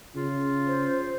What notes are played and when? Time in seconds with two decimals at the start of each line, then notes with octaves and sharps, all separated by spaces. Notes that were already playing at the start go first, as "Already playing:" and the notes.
0.16 C#3 F4
0.67 C5